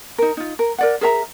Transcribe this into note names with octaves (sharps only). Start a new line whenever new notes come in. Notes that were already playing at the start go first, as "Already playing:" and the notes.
D#4 A#4
D#4 F4
A#4
A#4 D5 F#5
G#4 A#4 E5 A#5